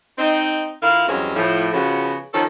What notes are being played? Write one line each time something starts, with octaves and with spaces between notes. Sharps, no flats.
C4 D#4
D3 E4 F4 A#4 F5
E2 G2 F#3 G#3 C4 C#4
A2 F3
C#3 F3 B3 F#4
D#3 F3 C#4 A4